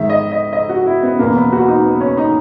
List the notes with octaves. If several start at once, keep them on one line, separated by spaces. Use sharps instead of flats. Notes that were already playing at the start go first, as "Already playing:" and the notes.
Already playing: G#2 D#3 E5
D#5
D#5
D#5
F#4
E4
B3
E2 B2 A#3
B3
F#4
D#4
B3
C#4
D#4